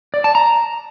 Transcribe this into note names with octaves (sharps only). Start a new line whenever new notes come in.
D5
A5
A#5